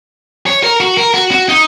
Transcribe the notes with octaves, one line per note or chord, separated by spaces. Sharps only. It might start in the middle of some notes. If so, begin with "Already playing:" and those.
C#5
A#4
F#4
A#4
F#4
F#4
D#4